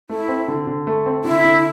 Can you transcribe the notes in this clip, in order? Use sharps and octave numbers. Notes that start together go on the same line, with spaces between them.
A3 E4
C4
D3
D3
A3
C4
D3 E4
D3